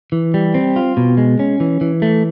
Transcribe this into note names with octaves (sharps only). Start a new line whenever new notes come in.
E3
G3
C4
F4
B2
G#3
C#4
E3
E3
A3